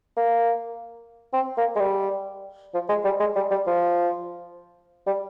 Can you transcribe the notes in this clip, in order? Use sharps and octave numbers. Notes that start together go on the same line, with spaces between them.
A#3
C4
A#3
G#3
G3
F3
G#3
G3
G#3
G3
G3
F3
G3